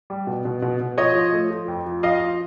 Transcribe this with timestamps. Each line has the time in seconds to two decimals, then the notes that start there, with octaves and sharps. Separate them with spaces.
0.10 G3
0.27 B2
0.45 B2
0.62 B2
0.80 B2
0.98 F3 C#5 D#5
1.15 F3
1.33 A3
1.51 F3
1.68 F2
1.86 F3
2.03 F3 D#5 F5
2.22 F3